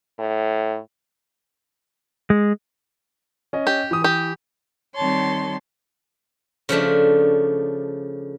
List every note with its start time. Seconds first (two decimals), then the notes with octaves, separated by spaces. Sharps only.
0.19 A2
2.30 G#3
3.53 C#4 D#5
3.67 G4
3.91 E3 D#6
4.04 G4
4.96 D#3 G3 C4 C#5 A5 C6
6.69 C#3 F3 A3 D4